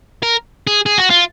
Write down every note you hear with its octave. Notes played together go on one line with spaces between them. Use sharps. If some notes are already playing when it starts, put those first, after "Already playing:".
A#4
G#4
G#4
F#4
F4